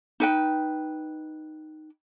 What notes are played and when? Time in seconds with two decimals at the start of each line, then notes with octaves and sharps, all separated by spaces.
0.20 D#4 B4 G5